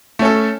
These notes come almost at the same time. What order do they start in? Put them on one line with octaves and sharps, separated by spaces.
A3 C#4 A4